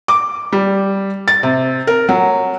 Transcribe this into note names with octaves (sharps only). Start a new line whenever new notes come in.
D6
G3
A6
C3
A#4
F#3